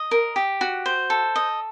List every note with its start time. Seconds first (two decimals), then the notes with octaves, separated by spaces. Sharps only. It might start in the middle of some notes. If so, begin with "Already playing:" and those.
Already playing: D#5
0.11 A#4
0.36 G4
0.61 F#4
0.86 C5
1.10 A4
1.36 D#5